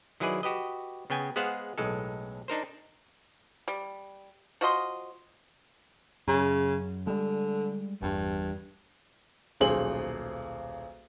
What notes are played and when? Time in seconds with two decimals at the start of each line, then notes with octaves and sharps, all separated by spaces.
0.20 D#3 F#3 E4 G#4 B4 D5
0.43 F#4 G4 B4 D#5
1.10 C#3 B3 G5 G#5
1.36 G#3 B3 G#4 C5 F5 F#5
1.78 B1 A2 G#3 A4
2.48 D4 D#4 A#4 C5
3.68 G3
4.61 F3 F#4 D#5 C6
6.28 F#2 C#3
7.07 D3 G3 G#3
8.02 G1 E2 G2
9.60 D#1 B1 G#4 C5 F#7